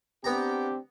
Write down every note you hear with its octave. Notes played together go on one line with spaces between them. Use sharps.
B3 C4 D4 G4 A#5